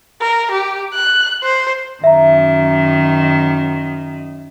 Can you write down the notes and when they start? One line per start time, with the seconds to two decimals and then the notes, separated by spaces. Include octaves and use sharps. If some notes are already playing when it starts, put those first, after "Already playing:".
0.21 A#4
0.52 G4
0.94 F#6
1.44 C5
2.04 F#2 D#3 E5 A#5